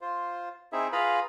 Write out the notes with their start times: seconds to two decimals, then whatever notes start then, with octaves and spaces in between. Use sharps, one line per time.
0.01 F4 C5
0.72 C4 D#4 E4 G#4 E5
0.92 F4 G#4 B4 F5 A#5 B5